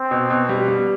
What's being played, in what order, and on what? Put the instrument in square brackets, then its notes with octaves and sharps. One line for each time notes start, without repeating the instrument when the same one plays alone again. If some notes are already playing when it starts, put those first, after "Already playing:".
Already playing: [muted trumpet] C4
[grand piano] B2
B2
G3
G3